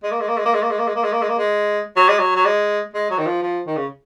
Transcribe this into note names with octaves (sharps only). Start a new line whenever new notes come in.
G#3
A#3
G#3
A#3
G#3
A#3
G#3
A#3
G#3
A#3
G#3
A#3
G#3
A#3
G#3
A#3
G#3
F#3
G#3
F#3
F#3
G#3
G#3
F#3
D#3
F3
F3
D#3
C#3